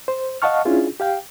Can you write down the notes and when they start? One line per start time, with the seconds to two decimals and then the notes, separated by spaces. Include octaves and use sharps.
0.08 C5
0.42 D#5 F5 F#5 A5 C#6 F6
0.65 C#4 D4 E4 F4 G#4
1.00 G4 F5 G5